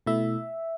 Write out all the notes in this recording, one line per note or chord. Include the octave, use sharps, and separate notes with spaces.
B2 A3 E4 E5